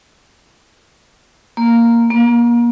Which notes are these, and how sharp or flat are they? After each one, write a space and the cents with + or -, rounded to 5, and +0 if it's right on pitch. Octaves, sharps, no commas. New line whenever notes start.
A#3 +0
A#3 +30